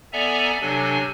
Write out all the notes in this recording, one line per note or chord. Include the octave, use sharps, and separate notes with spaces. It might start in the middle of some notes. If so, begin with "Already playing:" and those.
B3 A4 D5 E5 G#5 A#5
C3 F#3 D4 A4 G#5